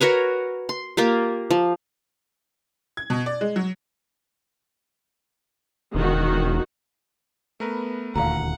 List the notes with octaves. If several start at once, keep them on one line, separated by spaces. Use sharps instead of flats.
F#4 A#4 B4 C#5
C6
A#3 F4 G4
F3
G#6
B2
D5
G#3
F#3
E1 D#3 F#4
A3 B3 A#4 B4
D#1 D2 F5 F#5 A#5